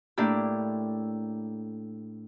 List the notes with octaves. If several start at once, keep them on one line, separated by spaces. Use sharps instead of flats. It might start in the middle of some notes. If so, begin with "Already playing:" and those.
A2 A#3 D4 E4 G4